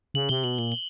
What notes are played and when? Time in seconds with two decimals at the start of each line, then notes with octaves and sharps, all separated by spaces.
0.14 C#3 F#7
0.29 C3 G7
0.44 B2 F#7
0.59 A#2 G7
0.72 G7